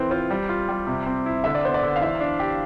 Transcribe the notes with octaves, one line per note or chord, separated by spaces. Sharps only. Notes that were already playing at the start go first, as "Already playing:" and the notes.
Already playing: E3 C4 A4 B4 C5
F4 C5
G3
F4
G3
C3
C4
E4
D3 E5
D5
B3 C5
D5
D3
F5
E3 E5
D4
G4